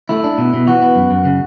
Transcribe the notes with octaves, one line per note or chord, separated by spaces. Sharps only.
A3 E4
D4
B2
B2
E3 F#4
B3
F#2
F#2
C#3